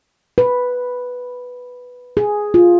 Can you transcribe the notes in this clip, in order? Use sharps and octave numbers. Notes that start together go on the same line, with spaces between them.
B4
G#4
F4